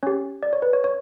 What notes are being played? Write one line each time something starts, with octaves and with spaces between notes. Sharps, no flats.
C#4 G4 C#5
D5
C#5
B4
C#5
C#5